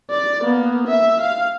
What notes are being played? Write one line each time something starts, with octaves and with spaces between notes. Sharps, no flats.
D5
A#3 B3
E5
F5